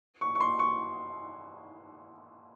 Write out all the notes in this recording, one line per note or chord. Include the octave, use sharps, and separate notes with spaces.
C#6
C#6
C6
C#6